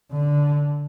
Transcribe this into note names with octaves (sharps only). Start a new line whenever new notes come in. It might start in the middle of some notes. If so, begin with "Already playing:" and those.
D3